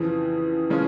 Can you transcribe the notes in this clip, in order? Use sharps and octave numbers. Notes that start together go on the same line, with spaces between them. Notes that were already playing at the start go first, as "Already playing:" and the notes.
Already playing: F2 C#3 E3 F3
C#3 F3 G#3 C#4 F4